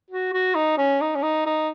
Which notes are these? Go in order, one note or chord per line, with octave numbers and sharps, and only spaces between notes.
F#4
F#4
D#4
C#4
D#4
C#4
D#4
D#4